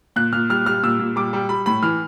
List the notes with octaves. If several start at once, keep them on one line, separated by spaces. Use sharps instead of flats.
A#2 F#6
A#2 F6
G3 F6
G3 F6
A#2 E6
A#2
G3 D6
G3
G3 B5
A2 B5
E3 F6